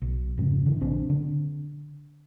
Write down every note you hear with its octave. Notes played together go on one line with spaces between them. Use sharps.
B1
F1 G#2 C#3
D3 E3
A#1 B3 C4 D4
D3